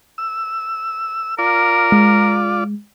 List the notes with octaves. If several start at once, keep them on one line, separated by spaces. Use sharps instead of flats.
E6
F4 A#4 D5
G#3